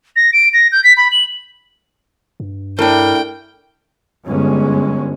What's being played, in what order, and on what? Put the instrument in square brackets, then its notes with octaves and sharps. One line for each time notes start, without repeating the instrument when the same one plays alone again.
[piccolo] A#6
D7
A#6
G6
B6
B5
F#7
[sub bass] G2
[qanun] A3 D4 [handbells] E4 A#4 [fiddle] G5
[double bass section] G1 G2 G#3 C#4